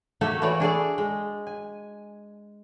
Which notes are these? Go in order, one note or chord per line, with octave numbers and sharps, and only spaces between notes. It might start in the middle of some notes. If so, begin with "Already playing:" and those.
A3 A#3 F#4 G4 A4
E3 A3 F#4 C#5 D5
D4 G#4 A4 D5
G#3
G#5